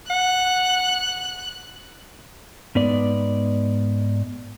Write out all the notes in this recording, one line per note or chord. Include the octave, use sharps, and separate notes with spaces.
F#5 F#6
G#2 B3 D5